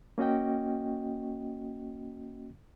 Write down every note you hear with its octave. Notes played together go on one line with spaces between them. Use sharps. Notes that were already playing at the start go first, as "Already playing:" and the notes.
A#3 C#4 F#4 D#5 G5